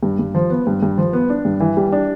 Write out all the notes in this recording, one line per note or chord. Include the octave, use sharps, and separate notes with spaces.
G2
G2
F3
B3
G2
G2
F3
B3
D4
G2
E3
G3
D4